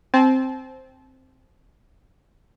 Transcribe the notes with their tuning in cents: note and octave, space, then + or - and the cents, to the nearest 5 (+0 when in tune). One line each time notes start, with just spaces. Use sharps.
C4 +0 A5 -35